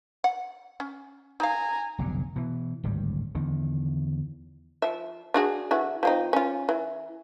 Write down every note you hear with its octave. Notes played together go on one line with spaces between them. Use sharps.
F#5
C#4
D#4 F5 G#5 A#5
F1 B1 G2 D3
B2 E3
D1 G#1 G2 G3
E2 D3 D#3
F3 E5
D4 F#4 G#4
D3 E3 F#4
F3 C4 D#4
C#4 F4
E3